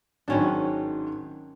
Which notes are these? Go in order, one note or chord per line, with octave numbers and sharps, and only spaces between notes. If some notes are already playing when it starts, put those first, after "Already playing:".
G#1 G#2 D#3 F#3 C#4 D4